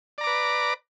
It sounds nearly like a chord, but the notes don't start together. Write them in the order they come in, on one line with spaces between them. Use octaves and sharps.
D5 A#5 D6 B4